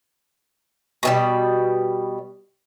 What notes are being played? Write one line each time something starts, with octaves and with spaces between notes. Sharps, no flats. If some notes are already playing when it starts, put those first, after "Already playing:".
B2 D#3 G3